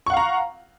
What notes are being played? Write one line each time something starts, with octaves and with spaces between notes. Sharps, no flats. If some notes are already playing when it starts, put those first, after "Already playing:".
F5 F#5 A#5 C#6